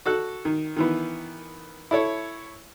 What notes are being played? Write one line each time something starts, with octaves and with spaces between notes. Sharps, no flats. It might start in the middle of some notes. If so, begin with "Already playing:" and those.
F#4 A4 F#6
D#3
D#3 E3 B3
E4 A4 C#5